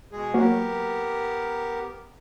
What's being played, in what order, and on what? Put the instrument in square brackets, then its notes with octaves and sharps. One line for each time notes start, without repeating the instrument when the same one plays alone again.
[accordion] B2 G#3 G#4
[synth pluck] F#3 A#3 F#4 [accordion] B3 G4 A#4